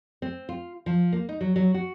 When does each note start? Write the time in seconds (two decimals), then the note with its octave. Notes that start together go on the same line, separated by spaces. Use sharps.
0.22 C4
0.49 F4
0.86 F3
1.13 A#3
1.29 D#4
1.41 F#3
1.56 F#3
1.74 F#4